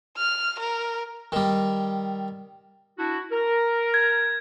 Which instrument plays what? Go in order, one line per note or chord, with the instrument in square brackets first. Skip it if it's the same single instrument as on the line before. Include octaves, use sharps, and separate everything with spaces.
[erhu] F6
A#4
[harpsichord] D#3 G3
[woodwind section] D4 E4 F#4
A#4
[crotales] G#6